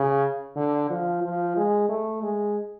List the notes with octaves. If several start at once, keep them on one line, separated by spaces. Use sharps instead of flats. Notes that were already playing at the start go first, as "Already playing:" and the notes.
Already playing: C#3
D3
F3
F3
G#3
A3
G#3